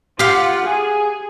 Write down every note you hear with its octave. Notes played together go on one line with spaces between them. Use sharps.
F4 G4 F5 F#5
G#4